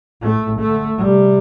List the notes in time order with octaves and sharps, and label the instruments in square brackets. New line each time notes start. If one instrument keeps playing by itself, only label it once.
[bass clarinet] A2 [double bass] A3
[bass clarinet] A2
[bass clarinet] D3 [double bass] A3
[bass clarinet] C3 [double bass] G3